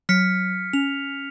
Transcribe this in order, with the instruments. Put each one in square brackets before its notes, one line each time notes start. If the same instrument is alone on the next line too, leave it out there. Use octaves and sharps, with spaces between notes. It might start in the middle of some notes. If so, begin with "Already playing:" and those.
[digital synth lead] F#3 [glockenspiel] F6 B6 C#7
[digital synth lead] C#4 [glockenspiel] F7